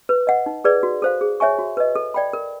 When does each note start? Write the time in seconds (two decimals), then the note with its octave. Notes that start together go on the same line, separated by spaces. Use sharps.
0.09 B4
0.27 D#5 F#5
0.46 D#4
0.64 G#4 B4 D5
0.83 F#4
1.02 A4 C5 F5
1.21 G#4
1.40 C#5 E5 G#5 C#6
1.59 F#4
1.77 B4 D#5
1.95 A4
2.14 D5 G5 B5
2.33 A#4